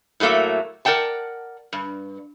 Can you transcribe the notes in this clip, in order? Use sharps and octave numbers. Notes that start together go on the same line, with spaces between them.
A2 F#3 A3 A#3 E5
A#4 D5 F#5 G5 A5
G2